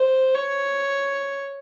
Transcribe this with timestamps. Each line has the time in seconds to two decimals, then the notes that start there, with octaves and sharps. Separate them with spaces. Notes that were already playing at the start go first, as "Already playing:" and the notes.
Already playing: C5
0.34 C#5